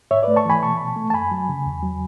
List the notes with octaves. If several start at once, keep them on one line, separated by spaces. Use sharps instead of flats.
G#2 C#5 E5
A3 B4 D5
A5 C#6
E3 G#5 B5
B2 A5 C#6
B2
A3
A5
F#2 G#5 B5
F#3
C#3
E2
F#3